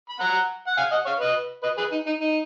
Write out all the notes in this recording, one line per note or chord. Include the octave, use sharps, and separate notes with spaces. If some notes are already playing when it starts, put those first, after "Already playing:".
B5
F#5 A#5
F#5
F5 G#5
D#5 F#5
C#5 F5
B4 D#5
B4 D#5
G#4 B4
D#4
D#4
D#4